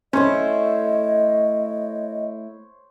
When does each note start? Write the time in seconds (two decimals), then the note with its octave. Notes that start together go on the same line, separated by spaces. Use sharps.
0.13 A3 C#4 E4 C5 C#5 D#5